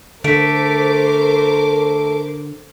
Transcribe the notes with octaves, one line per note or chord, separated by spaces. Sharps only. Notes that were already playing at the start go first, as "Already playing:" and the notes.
D3 A3 A#4 C5 D6 B6 D7